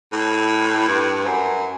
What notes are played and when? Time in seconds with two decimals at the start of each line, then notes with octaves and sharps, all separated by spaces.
0.12 A2
0.88 G2
1.26 F#2